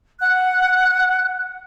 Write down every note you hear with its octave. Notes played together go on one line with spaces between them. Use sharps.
F#5 F#6